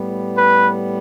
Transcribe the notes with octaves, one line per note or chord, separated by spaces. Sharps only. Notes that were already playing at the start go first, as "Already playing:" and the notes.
Already playing: A2 G3 B3
B4